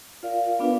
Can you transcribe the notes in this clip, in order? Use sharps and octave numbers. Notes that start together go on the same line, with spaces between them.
F4 A#4 D5 F5
B3 D4 F4 B4 F5